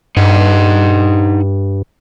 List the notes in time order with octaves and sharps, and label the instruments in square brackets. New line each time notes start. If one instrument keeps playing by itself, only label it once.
[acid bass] G2 [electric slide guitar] D#4 D#5 F#5